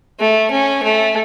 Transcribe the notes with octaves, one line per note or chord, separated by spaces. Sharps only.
A3
C#4
A3